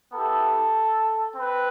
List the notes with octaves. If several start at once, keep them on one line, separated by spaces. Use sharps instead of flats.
B3 E4 G4 A4
C4 B4